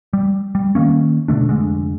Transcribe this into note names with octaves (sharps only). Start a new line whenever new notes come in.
G3
G3
D#3 F#3 A#3 C#4
B2 D3 A3 D4
F1 D3 G#3